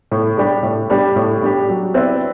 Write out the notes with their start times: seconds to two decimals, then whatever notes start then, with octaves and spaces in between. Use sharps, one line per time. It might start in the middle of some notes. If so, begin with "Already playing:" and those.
0.11 A2
0.37 G3 D4 G4
0.63 A2
0.90 G3 D4 G4
1.16 A2
1.42 G3 D4 G4
1.69 F#3
1.94 C4 E4 B4 D5